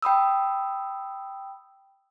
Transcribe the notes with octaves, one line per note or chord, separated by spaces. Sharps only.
G5 B5 D#6 E6